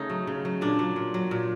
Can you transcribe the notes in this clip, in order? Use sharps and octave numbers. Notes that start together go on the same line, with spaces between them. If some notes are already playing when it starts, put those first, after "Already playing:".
Already playing: C#3 A3 D#4
F#3
C#3
F#3
A#2 D4
F#3
A#2
F#3
A#2